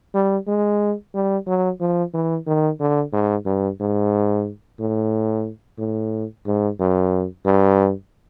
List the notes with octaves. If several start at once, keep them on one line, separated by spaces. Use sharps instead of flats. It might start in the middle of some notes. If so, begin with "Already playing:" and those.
G3
G#3
G3
F#3
F3
E3
D#3
D3
G#2
G2
G#2
A2
A2
G#2
F#2
G2